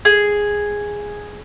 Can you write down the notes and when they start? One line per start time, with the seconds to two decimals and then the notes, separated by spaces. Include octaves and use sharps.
0.05 G#4